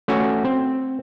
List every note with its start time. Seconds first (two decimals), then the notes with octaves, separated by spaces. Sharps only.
0.08 A3 C#4 F#4
0.44 C4